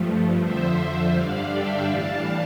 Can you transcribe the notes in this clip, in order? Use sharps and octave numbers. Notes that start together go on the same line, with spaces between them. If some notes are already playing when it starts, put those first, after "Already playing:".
Already playing: G2 F3 A3
F2 D3 F3 C5 E5
G2 D3 G3 D4 D5 F5
E5 G5
A2 E3 G3 D4 F5 A5